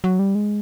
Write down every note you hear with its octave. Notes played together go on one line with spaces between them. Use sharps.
F#3
G3
G#3